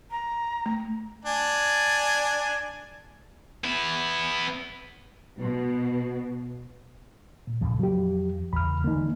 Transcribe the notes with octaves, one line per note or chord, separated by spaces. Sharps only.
A#5
A3
D4 G#5
B3 E4
B2
A#2
F2 A#2 C#3 F3
F#3 G4
E2 C#3 B5 F6
D3 E3 G#3 A#3 D#4